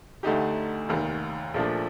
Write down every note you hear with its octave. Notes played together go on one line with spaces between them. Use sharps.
D2 D3 A3 D#4 G4
F1 D#2 D#3
A#1 A#2 F3 A3 D4